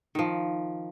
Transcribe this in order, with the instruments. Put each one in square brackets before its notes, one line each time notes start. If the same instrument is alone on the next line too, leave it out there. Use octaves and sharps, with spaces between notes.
[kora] D#3 F3